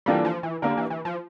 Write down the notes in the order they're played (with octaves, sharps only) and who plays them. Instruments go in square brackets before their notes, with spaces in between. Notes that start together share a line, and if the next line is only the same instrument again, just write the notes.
[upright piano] E3 A#3 D4 F4 A4 [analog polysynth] G3
[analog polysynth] F3
E3
[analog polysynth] D3 [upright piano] A#3 D4 G4 A#4
[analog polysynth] E3
E3
F3